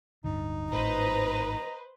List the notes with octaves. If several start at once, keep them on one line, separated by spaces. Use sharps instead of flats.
D1 G2 D3 D#4
G#1 A2 B4 C5 D#5 A#5